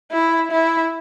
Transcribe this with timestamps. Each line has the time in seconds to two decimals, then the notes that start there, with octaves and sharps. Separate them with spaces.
0.12 E4
0.52 E4